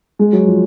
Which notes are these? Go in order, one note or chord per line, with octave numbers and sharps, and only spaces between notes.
G#3
F#3
F3